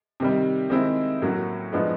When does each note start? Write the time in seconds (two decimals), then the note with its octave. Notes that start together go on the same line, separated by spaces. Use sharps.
0.20 C3 D#3 G3
0.70 D#3 G#3 C4 E4
1.22 A2 F#3 A#3 C#4 F#4
1.72 A2 F3 G#3 B3 D4